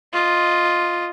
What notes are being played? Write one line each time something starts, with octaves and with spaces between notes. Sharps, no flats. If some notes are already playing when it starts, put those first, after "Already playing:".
F4 D#5